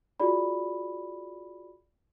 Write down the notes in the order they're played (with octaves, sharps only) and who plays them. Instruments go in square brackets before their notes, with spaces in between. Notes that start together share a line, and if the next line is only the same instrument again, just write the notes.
[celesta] F4 F#4 G#4 D5 B5